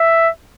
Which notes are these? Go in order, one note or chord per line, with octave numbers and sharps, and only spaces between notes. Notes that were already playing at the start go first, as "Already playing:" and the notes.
Already playing: E5